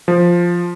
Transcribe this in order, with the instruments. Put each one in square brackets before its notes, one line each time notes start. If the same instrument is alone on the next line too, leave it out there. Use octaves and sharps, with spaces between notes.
[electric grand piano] F3